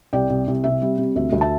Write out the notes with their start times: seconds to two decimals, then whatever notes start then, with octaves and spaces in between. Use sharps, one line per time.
0.13 C2 D5 G5
0.30 C2
0.47 C2
0.64 C3 E5
0.82 G3
0.98 C3
1.16 D2 E5
1.33 D2
1.41 E5 A5